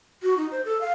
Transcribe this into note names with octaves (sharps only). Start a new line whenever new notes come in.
F#4
D#4
C5
A4
F5